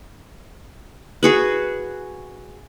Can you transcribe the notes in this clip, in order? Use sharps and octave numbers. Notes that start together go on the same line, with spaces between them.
F#4 G#4 B4